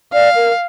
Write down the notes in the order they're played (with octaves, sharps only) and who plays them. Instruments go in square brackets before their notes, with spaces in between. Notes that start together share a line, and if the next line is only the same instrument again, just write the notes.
[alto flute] D5 [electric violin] F5
[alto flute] A#4